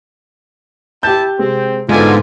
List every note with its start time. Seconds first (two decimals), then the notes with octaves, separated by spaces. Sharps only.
1.03 E4 G4 A5 G6
1.39 C3 G#3 C4
1.89 G#2 B2 D3 G#3 D#4 F4 D5 G#5